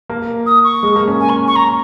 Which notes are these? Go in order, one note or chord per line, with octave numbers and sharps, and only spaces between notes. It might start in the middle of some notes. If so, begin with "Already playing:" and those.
A#3
D#6
C#6
G#3
A#3
C#4
G#5
C#6
C#6
A#5